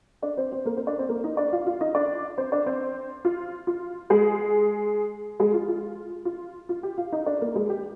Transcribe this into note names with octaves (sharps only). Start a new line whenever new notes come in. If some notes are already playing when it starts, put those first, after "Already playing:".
D4 D5
C4 C5
C4 C5
A#3 A#4
C4 C5
D4 D5
C4 C5
A#3 A#4
D#4 D#5
D4 D5
F4 F5
F4 F5
D#4 D#5
D4 D5
C4 C5
D4 D5
C4 C5
F4
F4
G#3 G#4
G#3 G#4
F4
F4
F4
F4
G4
F4 F5
D#4 D#5
D4 D5
A#3 A#4
G#3 G#4
G4